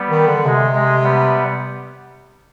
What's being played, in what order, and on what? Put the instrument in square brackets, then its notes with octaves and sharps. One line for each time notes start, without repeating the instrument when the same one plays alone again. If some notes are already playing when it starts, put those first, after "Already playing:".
Already playing: [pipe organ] G3 B3
[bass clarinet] D#3
D3
[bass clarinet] C3 [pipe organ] G#3
[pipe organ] G#3
G3 B3